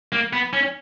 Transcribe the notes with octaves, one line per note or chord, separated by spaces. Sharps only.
A#3
B3
C#4